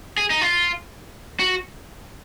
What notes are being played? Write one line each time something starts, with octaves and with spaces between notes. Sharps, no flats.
G#4
D#4
F4
F#4